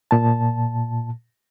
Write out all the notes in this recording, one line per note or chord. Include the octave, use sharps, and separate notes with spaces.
A#2 A5